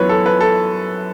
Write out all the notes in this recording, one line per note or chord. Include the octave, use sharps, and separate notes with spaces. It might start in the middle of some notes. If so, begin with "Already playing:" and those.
Already playing: F#2 E3 B3 B4 C#5
A4
B4
A4